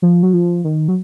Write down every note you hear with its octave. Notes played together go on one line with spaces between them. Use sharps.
F3
F#3
F3
D#3
F#3